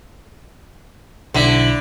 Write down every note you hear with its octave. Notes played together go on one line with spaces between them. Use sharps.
B1 D3 E4 B6